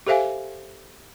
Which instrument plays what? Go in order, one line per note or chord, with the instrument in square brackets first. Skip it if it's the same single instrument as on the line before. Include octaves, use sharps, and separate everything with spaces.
[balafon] G4 A4 C5 E5 F5 G#5